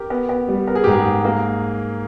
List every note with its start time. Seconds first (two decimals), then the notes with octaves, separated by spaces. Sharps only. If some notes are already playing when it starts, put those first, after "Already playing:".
Already playing: G4 A#4
0.10 B3
0.29 B3
0.49 G3
0.67 B3 A#4
0.75 G#4
0.84 G#2 G4
0.92 G#4
1.05 G#2
1.25 A#3